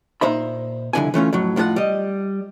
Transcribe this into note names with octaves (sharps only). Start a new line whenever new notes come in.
A#2 D#4 C5 E5 B5
C2 F2 B2 D3 E4 G#5
E3 A3 C#4 F4
F2 A2 F#3
F2 A2 F4 G#4 F#5
G3 D#5